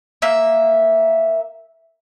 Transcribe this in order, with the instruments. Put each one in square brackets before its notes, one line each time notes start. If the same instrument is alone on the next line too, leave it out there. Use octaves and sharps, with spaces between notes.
[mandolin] A#3 E5